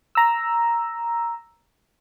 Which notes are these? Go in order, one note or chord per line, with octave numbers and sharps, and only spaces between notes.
A#5 E6